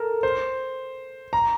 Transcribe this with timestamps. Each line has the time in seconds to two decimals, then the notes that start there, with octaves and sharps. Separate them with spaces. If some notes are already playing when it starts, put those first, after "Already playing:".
Already playing: A4 A#4
0.23 C5
1.33 A#5